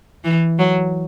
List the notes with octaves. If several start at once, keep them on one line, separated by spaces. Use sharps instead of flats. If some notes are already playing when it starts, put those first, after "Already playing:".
E3
F#3